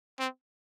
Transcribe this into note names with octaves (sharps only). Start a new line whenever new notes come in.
C4